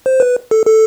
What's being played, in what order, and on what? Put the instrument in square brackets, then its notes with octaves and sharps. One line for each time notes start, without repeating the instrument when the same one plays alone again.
[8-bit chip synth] C5
B4
A4
A4